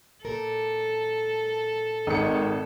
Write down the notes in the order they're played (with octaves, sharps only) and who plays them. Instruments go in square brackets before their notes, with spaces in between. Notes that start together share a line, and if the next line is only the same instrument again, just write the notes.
[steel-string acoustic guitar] A#2 A#4 [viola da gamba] A4
[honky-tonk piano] G#1 C#7 [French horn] D#3